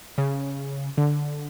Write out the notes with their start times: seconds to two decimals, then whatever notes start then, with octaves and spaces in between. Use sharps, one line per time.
0.18 C#3
0.98 D3